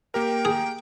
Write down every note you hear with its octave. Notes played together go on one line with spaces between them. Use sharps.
A#3 G4 A#4 G5
G#4